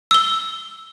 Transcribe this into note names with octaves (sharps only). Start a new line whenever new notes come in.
E6 G7